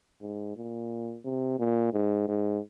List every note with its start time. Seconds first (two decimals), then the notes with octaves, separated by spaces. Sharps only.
0.21 G#2
0.56 A#2
1.25 C3
1.59 A#2
1.93 G#2
2.28 G#2